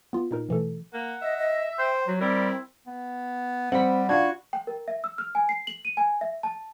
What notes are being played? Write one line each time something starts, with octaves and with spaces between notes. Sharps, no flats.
B3 F4
A#2 D#4 A#4
B2 E3 A3 A4
A#3 F#5
D#5 E5
D#5
C5 G5
F#3 F#4
G3 C4 E4 A#4
B3
G3 C4 F#5 B5
D4 F4 F#4 G#6
G5
A#4
E5
E6
F6
G#5
C7
F#7
D#7
G#5
E5
A5